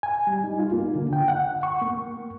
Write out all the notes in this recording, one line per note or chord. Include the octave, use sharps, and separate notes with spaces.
G#5
G3
D#4
F4
A#3
D3
G5
F#5
C#6
A#3